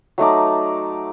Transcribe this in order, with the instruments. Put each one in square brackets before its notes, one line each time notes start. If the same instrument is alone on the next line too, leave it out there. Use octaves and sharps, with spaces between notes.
[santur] F#3 A3 D#4 D5